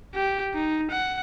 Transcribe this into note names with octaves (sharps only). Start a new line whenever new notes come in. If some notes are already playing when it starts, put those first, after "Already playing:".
G4
D#4
F#5